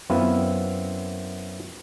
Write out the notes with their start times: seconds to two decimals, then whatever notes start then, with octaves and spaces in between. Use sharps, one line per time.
0.10 F#2 B3 C4 E4 F4